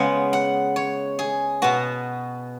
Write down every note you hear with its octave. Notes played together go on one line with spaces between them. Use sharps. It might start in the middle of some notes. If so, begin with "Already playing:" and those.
Already playing: C#3 G#3 B3 F#5
F#5
C#5
G#4
B2 B3 F#4